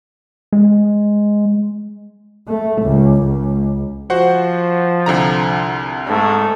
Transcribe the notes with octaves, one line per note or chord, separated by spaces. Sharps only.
G#3
A3
C#2
C#2
F3 F#4 C5 F#5
C2 D3 A#5
G#2 A3